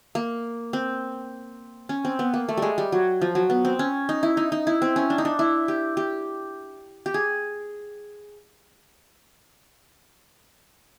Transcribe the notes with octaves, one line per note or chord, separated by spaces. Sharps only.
A#3
C4
C#4
C4
B3
A#3
A3
G3 G#3
G3
F#3
F3
F#3
B3
C4
C#4
D#4
E4
D#4
D#4
E4
C4
C#4
D4
D#4
D4
E4
G4
G4
G4
G#4